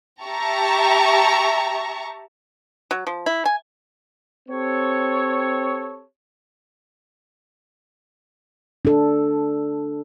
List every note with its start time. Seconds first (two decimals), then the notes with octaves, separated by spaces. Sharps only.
0.23 G4 E5 A5 A#5 C#6
2.91 F#3
3.07 F3
3.26 E4
3.45 G#5
4.49 C4 G4 A4 C#5
8.85 D4 A4